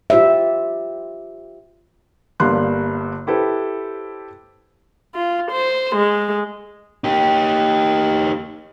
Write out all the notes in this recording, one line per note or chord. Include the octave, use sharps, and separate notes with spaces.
F4 G4 C5 D5 E5
G1 G2 D3 A#3 C6 F#6
E4 G4 A4 B4 C5
F4
C5
G#3
D#4 G4